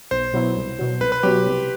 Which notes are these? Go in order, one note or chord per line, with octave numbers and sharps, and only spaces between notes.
B1 C5
B2 F#3 B3 E4
C2
B2 F#3
C2 B4
B4
B2 F#3 G4
C2